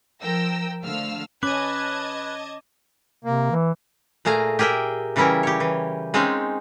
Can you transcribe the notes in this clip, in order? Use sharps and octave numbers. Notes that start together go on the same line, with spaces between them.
F3 A#4 G5 E6 A#6
D3 F3 A3 F5 E6 F6
C#4 B4 D#5 A5 D6 G#6 D#7
C3 A#3
E3
A#2 A3 G#4 F5 A#5
G4 G#4 A#4 E5 G5
C#3 E3 G3 C#4 E4 A#4
G4 C#5
E3
G#3 C4 C#4 D#4 F5